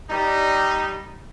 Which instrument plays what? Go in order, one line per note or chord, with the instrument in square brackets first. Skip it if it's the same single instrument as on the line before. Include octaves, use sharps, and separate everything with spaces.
[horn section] G3 D#4